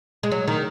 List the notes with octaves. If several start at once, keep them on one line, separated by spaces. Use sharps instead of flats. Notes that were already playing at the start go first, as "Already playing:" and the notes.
G#3
F#3
D#3